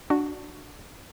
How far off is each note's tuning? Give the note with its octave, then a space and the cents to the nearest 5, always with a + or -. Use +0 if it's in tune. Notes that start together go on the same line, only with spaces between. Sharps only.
D4 +5 F#4 +0